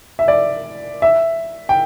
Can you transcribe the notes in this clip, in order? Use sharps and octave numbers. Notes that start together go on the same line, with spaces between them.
E5
D5
E5
G5